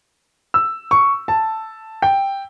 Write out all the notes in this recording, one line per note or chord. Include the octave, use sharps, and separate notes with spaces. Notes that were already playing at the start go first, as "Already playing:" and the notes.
E6
C#6
A5
G5